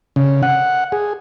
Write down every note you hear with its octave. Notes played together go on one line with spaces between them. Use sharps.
C#3
F#5
G#4